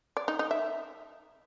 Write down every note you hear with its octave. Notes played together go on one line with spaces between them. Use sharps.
D5
D#4
D#4
E5